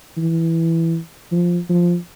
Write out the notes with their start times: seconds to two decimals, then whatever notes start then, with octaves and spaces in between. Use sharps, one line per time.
0.17 E3
1.32 F3
1.69 F3